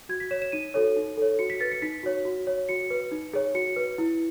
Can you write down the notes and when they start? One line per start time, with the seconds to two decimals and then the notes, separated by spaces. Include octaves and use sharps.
0.09 F#4 G#6
0.20 B6
0.31 C#5 E7
0.42 E7
0.52 D#4 D#7
0.74 F#4 A4 C#5
0.96 D#4
1.17 A4 C#5
1.39 F#4 C#7
1.50 B6
1.60 B4 A6
1.71 C#7
1.82 D#4 B6
2.03 F#4 C#5
2.25 F#4
2.47 C#5
2.69 F#4 C#7
2.90 B4
3.12 D#4
3.33 G#4 C#5
3.55 F#4 C#7
3.76 B4
3.98 E4